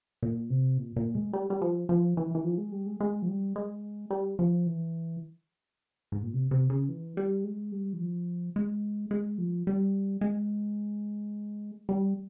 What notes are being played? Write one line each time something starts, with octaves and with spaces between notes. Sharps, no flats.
A#2
C3
A#2
A#2
G#3
G3
G3
F3
F3
E3
E3
F3
G#3
G3
G#3
G#3
F3
G3
G#3
G3
F3
E3
G#2
A#2
C3
C3
C#3
E3
G3
G#3
G3
E3
F3
G#3
G#3
F3
G3
G#3
G3